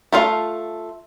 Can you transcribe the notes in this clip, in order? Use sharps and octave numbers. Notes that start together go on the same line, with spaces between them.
A3 F4 F5